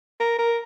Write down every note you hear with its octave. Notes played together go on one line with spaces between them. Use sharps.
A#4
A#4